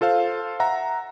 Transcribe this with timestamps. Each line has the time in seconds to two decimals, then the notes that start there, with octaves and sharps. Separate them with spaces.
0.01 F4 A4 C5 F5
0.60 E5 F#5 A#5